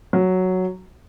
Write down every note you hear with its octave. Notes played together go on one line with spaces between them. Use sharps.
F#3